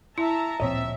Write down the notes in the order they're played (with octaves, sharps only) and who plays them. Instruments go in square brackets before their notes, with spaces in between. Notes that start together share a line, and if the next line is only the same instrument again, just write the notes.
[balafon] E4 [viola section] E5 A5 A#5
[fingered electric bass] D1 A#2 F3 [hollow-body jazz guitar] C4 C#5 D#5 [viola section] E5